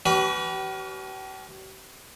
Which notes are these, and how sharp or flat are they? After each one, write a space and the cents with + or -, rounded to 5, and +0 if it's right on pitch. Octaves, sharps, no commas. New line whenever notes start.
C#4 +30 G4 -45 B4 +0